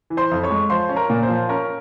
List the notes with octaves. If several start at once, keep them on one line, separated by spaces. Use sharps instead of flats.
E3
C5 C6
F2
C#5 C#6
G#3
F3 C5 C6
C#4
A#4 A#5
A#2
C5
F3
C#4 A#4